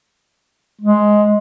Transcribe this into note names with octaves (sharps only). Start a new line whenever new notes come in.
G#3